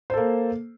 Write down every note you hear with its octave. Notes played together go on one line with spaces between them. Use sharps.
A#3 A4 C5